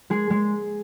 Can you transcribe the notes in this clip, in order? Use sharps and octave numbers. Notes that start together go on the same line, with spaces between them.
G#3 G#4
G#3